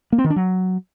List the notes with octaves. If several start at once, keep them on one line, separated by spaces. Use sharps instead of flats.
A#3
C4
D#3
D4
F#3